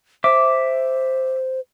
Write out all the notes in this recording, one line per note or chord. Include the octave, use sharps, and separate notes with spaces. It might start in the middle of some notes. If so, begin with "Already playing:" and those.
C5 E5 D6